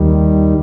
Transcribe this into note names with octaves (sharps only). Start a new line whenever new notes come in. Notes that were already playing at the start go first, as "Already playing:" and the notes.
Already playing: D#2 D#3 G3